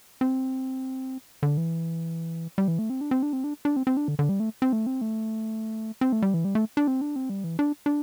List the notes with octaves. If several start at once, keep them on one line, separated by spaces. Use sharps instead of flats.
C4
D3
E3
G3
E3
A3
C4
D4
C4
D4
C4
D4
D4
C4
C4
D4
D3
D3
G3
A3
C4
A3
C4
A3
C4
A3
G3
E3
G3
A3
D4
C4
D4
C4
G3
E3
D4
D4